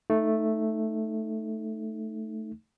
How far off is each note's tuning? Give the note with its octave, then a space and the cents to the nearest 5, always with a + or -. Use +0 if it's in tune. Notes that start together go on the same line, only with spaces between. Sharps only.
A3 +0 D#4 +0